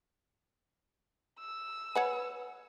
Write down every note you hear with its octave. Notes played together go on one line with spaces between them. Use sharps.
E6
B4 C#5 F#5 G#5